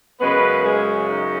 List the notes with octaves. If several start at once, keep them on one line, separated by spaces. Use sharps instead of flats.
F#2 C#3 G#3 B3 C#4 B4
G#3 G#4
D#4